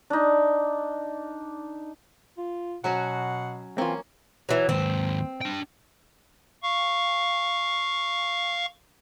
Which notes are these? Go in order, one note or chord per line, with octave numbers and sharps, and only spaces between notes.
D4 D#4
F4
B2 F#3 C#4 F#4 F#5
E3 A#3 C4 C#4 F4
E3 F#3
D#2 G#2 C4
D4 G5
F5 C#6